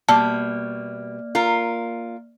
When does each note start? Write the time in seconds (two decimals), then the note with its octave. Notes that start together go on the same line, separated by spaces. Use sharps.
0.09 B2 G3 A#3 D5 A5 F6
1.35 F4 A#4